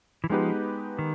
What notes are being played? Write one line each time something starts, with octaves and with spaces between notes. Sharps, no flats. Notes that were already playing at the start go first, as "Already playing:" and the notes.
E3
F3 G#3 B3 D#4 G4 B4
D#3